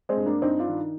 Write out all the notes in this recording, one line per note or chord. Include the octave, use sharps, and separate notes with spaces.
G#3 C4
G2
A#3 D4
G2 C4 D#4
D4 F4
D#3